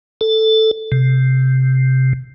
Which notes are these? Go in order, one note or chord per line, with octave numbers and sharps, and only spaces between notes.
A4
C3